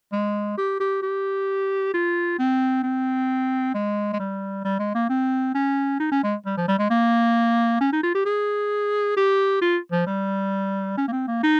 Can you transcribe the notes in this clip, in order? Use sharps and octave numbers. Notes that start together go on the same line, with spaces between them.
G#3
G4
G4
G4
F4
C4
C4
G#3
G#3
G3
G3
G#3
A#3
C4
C#4
D#4
C#4
G#3
G3
F3
G3
G#3
A#3
C#4
D#4
F4
G4
G#4
G4
F4
F3
G3
C#4
A#3
C4
A#3
D#4